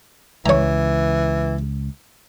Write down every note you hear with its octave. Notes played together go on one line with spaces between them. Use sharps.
C#2 E3 C#5 A#5